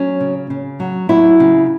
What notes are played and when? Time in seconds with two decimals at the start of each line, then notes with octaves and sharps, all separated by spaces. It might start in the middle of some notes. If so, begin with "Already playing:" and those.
Already playing: F#3 C#4
0.20 C#3
0.50 C#3
0.80 F#3
1.09 F#3 E4
1.40 C#3